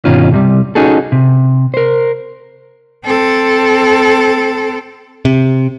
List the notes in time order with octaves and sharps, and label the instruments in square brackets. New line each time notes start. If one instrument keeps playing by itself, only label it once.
[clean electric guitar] G2 B2 D#3 C#4 F4
C2 C3 G3
C#4 D#4 F#4 G#4 A4
C3
A#4 C5
[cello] C4 A4
[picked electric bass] C3